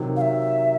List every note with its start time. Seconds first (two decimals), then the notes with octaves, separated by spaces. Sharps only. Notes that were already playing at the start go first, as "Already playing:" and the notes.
Already playing: C3 D#3 F#3
0.16 F5
0.21 E5